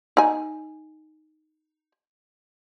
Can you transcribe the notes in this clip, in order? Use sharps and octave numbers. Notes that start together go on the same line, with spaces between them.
D#4 G#5